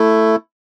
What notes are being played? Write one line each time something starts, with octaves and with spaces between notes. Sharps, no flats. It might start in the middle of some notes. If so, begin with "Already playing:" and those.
Already playing: A3 E4